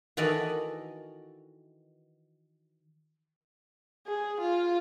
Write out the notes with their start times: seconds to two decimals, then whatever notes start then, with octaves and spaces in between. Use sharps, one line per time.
0.17 D#3 E3 F#4 A4 D5 D#5
4.07 G#4
4.41 F4